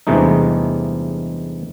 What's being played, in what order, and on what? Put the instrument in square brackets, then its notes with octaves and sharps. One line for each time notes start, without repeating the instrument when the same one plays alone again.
[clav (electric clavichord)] E2 G2 C3 G#3 A3 D#4